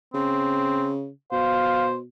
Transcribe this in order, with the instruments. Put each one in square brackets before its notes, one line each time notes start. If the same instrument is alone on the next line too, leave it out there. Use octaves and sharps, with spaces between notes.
[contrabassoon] C#3 [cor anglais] C4
[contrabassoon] B2 [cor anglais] C5 [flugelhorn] F5